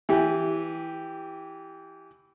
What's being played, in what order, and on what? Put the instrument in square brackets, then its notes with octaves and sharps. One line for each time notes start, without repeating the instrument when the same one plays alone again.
[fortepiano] E3 G4